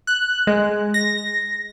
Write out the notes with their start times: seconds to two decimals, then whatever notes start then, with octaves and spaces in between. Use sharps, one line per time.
0.07 F#6
0.47 G#3
0.94 A#6